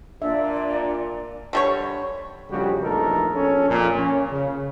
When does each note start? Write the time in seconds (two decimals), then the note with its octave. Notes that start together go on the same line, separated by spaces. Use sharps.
0.22 A#2 D4 D5 E5
1.53 D3 G3 C#5
2.50 A#1 F2 C#3 G3 F#4 G4
2.83 A#1 E2 A3 D#4 A4 A#4
3.34 A#1 C#4 A4
3.69 F2 A#2
3.98 C#4
4.30 C#3